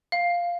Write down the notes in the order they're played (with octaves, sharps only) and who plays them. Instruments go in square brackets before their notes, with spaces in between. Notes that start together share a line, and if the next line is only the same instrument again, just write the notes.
[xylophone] F5